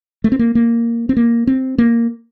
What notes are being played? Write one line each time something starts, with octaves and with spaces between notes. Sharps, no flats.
A3
C4
A#3
A#3
C4
A#3
C4
A#3